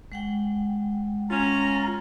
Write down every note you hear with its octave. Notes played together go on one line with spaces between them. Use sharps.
G#3 F#5 G5
C#4 F4 A#5